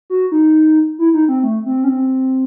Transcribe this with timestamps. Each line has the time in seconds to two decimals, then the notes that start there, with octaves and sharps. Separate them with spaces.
0.10 F#4
0.32 D#4
0.99 E4
1.14 D#4
1.29 C4
1.43 A3
1.66 C4
1.84 C#4
1.89 C4